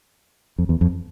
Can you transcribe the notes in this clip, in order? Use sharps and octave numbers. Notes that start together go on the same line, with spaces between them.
F2
E2
F2